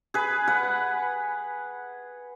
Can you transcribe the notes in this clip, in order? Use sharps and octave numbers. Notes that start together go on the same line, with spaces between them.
G#4 B4
B4 F#5